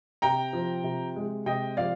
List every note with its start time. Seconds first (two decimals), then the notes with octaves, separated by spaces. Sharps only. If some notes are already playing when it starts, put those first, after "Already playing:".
0.22 C3 G5 A#5
0.53 F3
0.84 C3
1.16 G#3
1.46 C3 D#5 G5
1.77 F3 D5 F5